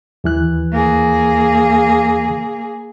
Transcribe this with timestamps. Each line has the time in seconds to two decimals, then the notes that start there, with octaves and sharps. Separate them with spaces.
0.24 D#2 E3 F#6
0.72 A#3 G#4